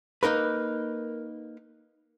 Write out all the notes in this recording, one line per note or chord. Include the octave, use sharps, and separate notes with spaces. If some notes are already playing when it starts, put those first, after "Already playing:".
A#3 D#4 A#4 B4